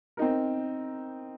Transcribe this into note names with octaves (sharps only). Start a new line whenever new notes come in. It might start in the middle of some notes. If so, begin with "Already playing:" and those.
C4 D#4 A#4